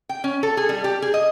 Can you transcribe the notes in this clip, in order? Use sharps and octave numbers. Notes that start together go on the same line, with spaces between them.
G5
C#4
A4
G#4
G3
G4
G#4
D#5